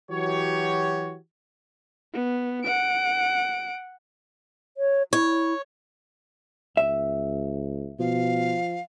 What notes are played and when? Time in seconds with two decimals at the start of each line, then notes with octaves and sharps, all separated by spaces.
0.11 E3 F#3 F#4 G4 C#5
2.13 B3
2.64 F#5 D7
4.77 C#5
5.13 E4 C#5
6.77 C#2 E5
7.99 B2 F3 F5